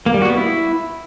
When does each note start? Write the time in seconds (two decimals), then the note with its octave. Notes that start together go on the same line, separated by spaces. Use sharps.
0.06 A#3
0.14 G3
0.22 F#4
0.30 B3
0.37 E4